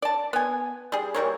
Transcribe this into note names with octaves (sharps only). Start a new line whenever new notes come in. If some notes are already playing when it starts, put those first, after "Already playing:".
D5 A5
B3 G#5
G3 G#4
E3 G3 A#3 C#5